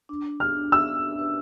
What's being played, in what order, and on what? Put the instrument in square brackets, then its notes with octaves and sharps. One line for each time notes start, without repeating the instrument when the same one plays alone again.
[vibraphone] D4
D4
[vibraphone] G4 [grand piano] F6
[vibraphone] D4
[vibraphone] E5 [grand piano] E6
[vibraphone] G4
G4
B4